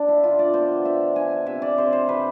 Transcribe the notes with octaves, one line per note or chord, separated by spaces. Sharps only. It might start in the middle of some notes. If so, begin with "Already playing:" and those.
Already playing: D4
E4
D3 F4
D5
B3 C5
D4 E5
D4 G#5
C3 E5
D5
C3 C5
C5
C3 B4